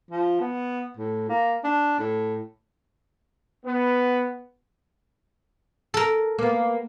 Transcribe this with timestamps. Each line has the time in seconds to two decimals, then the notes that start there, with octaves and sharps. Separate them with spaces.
0.11 F3
0.40 B3
0.97 A2
1.29 A#3
1.64 D4
1.99 A2
3.64 B3
5.94 A4 A#4
6.38 A#3 B3